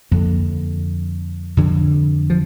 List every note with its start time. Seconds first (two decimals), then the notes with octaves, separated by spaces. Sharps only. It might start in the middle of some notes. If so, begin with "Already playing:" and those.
0.11 F2 D3 A#3
1.57 F2 D3
2.30 F3